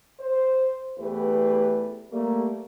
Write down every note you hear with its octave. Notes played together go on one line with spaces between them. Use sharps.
C5
E2 A3 G4 B4
G3 A3 A#3